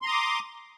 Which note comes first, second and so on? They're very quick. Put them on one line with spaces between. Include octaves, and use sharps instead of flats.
C6 A#5 D#6 D6